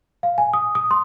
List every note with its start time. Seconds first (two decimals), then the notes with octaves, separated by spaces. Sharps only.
0.23 F5
0.38 G#5
0.53 D#6
0.75 D#6
0.91 C6